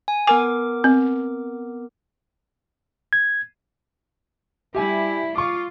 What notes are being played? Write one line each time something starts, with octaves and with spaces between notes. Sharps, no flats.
G#5
B3 A#4 G#5 D6
C4
G#6
G3 E4 G4 E5 G#5
F4 C#6 D6